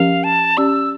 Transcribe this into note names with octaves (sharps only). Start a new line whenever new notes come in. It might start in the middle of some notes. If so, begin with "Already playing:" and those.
Already playing: F3 C#4 G4 A#4 F5
A5
C#4 G4 D5 E6